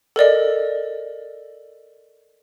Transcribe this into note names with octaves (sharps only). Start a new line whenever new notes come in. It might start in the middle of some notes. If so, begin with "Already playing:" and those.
A4 A#4 D5 D#5